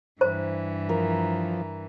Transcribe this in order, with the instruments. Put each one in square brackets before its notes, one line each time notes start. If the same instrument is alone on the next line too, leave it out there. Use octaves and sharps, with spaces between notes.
[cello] G2 E3 [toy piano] C5 A#5
[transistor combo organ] F3 [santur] A#4